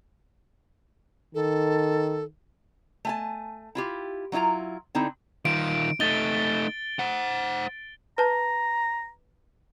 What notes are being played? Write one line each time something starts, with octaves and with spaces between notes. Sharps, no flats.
D#3 A4
A3 G#5 A5
E4 F4 G4
F#3 D4 E4 F4 A#5
D3 C4 D#4 E4
D#3 F4 D7
A3 D#4 A6 G7
C5 F#5
B4 A5 A#5